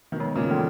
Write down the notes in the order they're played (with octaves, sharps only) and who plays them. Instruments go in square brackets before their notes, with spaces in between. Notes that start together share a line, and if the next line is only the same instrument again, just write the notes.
[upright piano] B2 D#3
[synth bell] G#3
[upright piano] A#2 C#3
[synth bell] E3